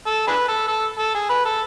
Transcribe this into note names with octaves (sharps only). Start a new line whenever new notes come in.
A4
D4 G#4 B4
A4
A4
A4
G#4
B4
A4